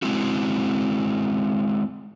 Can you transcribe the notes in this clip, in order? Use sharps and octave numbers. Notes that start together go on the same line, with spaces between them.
G#3 C4 E4 F#4